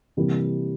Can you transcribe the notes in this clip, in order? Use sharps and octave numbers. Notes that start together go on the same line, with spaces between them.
C3 E3 G3 A#3